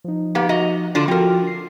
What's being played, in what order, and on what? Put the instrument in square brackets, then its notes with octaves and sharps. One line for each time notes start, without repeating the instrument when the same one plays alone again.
[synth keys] F3 D#4
[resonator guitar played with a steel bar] A#3 B3 G4
F#4 D#5 A#5
D3 D4 F4
[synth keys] F3 F4 F#4 [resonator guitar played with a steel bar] C4 A#4
[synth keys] C7